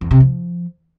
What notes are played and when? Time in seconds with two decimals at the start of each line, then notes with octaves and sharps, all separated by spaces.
0.01 E2
0.11 C3
0.20 F3